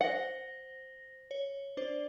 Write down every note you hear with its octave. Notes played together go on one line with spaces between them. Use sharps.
C5 F#5 A#6
C#5
D4 C5 D5